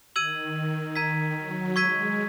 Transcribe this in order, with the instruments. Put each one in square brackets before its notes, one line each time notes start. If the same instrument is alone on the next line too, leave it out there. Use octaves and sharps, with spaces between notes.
[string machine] D#3 [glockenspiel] E6 G#6 D#7 F#7
[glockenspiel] A#5 E6 G#6 B6 D#7
[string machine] F#3
[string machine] G#3 [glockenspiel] C#6 E6 G#6 B6 D#7